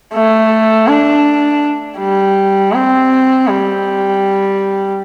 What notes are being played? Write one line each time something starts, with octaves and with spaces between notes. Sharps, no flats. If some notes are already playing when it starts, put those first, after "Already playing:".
A3
D4
G3
C4
G3